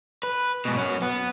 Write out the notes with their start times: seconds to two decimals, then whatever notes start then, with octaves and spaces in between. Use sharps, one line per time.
0.23 B4
0.65 G#2 B2
0.77 F#3 C#4
1.02 B3